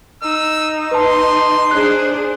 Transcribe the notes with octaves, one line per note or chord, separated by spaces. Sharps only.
D#4 E6
B4 A5 C6
D4 G#4 C5 F#6